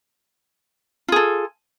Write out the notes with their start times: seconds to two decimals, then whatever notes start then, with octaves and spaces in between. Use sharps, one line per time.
1.08 F4
1.12 G#4
1.16 A4